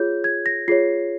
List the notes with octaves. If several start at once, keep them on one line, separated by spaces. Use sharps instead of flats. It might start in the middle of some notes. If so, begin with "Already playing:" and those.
Already playing: F4 G#4 C#5 G6
G#6
A#6
F4 G#4 C#5 C7